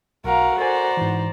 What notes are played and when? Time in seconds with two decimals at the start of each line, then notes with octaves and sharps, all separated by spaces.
0.24 B1 F#4 A#4 F5 F#5
0.57 A4 A#4 C5 D5 G#5 A#5
0.97 G#2 E3